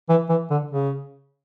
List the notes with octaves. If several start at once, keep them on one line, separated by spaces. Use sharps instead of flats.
E3
E3
D3
C#3